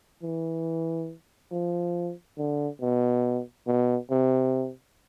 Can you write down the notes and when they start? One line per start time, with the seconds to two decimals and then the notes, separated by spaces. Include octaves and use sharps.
0.22 E3
1.52 F3
2.38 D3
2.81 B2
3.67 B2
4.10 C3